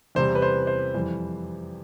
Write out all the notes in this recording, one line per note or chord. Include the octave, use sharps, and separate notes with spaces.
E2 C3 G3 C5
B4
C5
C5
F2 E3 G3